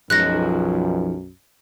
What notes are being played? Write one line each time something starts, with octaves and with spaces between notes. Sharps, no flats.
B1 F#2 F3 G#3 D#4 F#6 A#6